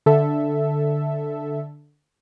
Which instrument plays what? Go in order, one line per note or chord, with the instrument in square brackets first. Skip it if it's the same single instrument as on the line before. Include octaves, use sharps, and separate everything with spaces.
[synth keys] D3 A4 E5